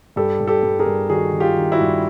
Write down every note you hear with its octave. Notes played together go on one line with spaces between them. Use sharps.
G2 G4 A4
G2
G4 A4
G2
G#4 A#4
G2
D#3 F#4 G#4
D#3
F4 G4
D#3
E4 F#4
G2